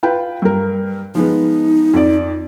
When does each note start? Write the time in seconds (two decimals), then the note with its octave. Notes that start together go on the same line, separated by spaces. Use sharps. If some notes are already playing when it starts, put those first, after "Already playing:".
0.03 F4 B4 G5
0.42 G2 A#4
1.15 F3 G#3 B3 D#4
1.94 F2 D5